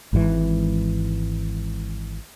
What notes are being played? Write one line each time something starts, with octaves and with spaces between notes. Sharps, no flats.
G#1 G#2 D#3 E3